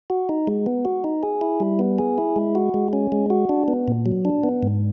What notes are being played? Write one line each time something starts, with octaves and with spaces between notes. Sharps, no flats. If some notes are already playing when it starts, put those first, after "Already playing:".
F#4
D#4
G#3
B3
F#4
D#4
G#4
E4
G3
B3
G#4
E4
G#3
F#4
G#3
C#4
G#3
F#4
D4
B3
A#2
F#3
D4
B3
G#2